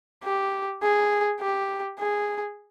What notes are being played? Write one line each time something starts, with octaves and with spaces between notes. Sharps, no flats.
G4
G#4
G4
G#4